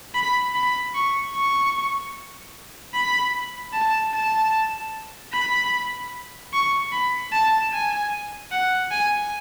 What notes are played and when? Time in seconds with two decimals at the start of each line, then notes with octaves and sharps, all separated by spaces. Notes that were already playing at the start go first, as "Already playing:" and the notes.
0.14 B5
0.54 B5
0.94 C#6
1.34 C#6
2.94 B5
3.73 A5
4.14 A5
5.33 B5
6.53 C#6
6.92 B5
7.32 A5
7.72 G#5
8.51 F#5
8.91 G#5